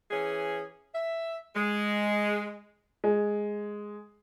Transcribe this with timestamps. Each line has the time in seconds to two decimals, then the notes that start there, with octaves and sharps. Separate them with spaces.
0.10 E3 C#4 G#4
0.93 E5
1.54 G#3
3.04 G#3